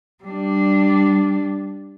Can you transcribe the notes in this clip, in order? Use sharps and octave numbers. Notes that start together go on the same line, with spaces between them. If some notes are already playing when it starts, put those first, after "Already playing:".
G3 D4